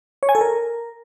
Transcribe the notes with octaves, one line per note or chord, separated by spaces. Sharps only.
C#5
G#5
A4
A#4